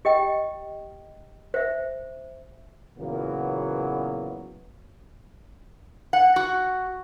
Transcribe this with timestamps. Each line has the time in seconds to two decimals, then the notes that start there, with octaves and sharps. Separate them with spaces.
0.05 G4 D#5 G5
1.54 C5 E5
2.99 A#2 C#3 E3 F#3 A#3 B3
6.13 F#5
6.36 F#4